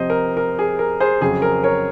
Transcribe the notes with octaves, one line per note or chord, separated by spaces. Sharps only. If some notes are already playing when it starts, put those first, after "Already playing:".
Already playing: C3 F3 C4 C5 D#5
A#4
A#4
G#4
A#4
G#4 C5
F2 C#3 F#3 C4 G#4
A#4
A#4 C#5